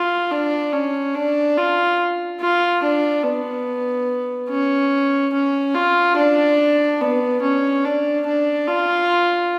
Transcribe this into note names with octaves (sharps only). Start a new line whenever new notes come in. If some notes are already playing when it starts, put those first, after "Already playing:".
Already playing: F4
D4
C#4
D4
F4
F4
D4
B3
C#4
C#4
F4
D4
B3
C#4
D4
D4
F4